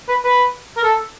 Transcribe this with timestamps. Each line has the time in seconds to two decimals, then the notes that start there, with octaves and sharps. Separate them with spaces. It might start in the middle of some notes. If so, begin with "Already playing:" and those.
0.08 B4
0.24 B4
0.77 A#4
0.83 A4